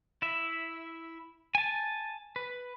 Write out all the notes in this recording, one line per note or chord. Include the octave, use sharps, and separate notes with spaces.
E4 E5
G#5 A5
B4